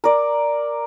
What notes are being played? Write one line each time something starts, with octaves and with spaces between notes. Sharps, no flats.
A#4 D5